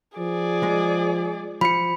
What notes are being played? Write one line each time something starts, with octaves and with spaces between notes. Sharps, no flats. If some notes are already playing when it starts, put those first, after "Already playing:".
F3 G#4 D5
G#3
F3 B5 C#7